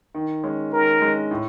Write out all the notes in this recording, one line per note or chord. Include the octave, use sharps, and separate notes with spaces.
D#3
G#3 C#4
D#3 A#4
G#3 C#4
A2